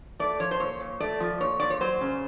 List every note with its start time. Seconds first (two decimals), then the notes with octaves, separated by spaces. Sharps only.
0.19 A3 D5
0.40 F3 C#5
0.51 C5
0.60 A#2 C#5
0.80 A#2
1.00 A3 D5
1.20 F3
1.41 A#2 C#5
1.60 A#2 D5
1.70 C#5
1.81 F#3 C5
2.01 C#3